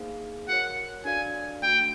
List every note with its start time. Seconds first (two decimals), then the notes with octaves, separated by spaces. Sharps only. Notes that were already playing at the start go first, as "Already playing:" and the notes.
Already playing: A#3 D#4 G#4 C5 F5
0.49 F#4 A#4 C#5 F#5
1.05 D4 F#4 A4 D5 F5 G#5
1.62 A3 D4 F#4 G5